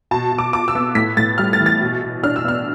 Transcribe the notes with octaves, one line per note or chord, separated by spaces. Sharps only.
B2 A5
B2
D6
F4 D6
E6
B3
A2 B6
A2 A6
G3 F6
A6
E3
A6
B2
B2
D4 F6
E6
B3 F6